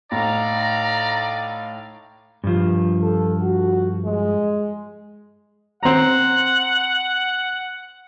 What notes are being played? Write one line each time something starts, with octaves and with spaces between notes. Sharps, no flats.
A2 D#4 D5 F5 A#5
G2 F3
A4
F#4
G#3
C4 F#5 A#5